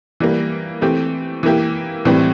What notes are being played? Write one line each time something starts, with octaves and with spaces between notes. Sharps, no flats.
E3 G3 A#3
E3 A3 C4 G4
E3 A#3 E4 G4
A2 E3 G3 C4